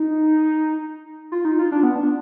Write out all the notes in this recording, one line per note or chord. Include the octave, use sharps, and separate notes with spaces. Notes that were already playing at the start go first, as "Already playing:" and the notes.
Already playing: D#4
F4
D#4
F4
D4
B3
D4